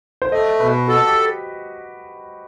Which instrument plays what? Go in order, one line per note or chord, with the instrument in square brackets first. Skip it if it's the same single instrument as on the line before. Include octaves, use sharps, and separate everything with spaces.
[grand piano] C5
[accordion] A3 [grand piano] D#5
[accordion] B2 [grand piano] B4
[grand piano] F#4 [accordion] A4
[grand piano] G4